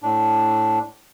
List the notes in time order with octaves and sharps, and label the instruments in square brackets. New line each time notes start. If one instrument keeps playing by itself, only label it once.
[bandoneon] A2 D4